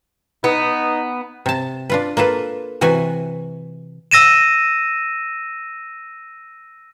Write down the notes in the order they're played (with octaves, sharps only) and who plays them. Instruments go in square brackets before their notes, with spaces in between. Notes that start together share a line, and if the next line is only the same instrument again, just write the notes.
[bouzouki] B3 [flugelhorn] D#4
[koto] C3 A5
D4 F4 B4
A#3 F4 A4 B4
C3 E3 F#4 B4 G#5
[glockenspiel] E6 A#6 D#7 E7